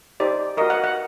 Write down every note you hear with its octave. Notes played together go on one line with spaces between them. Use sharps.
D#4 G4 C5 D5
F#4 A#4 D#5
F#5
F#5